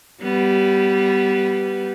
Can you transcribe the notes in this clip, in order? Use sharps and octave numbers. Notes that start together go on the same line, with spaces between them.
G3 B3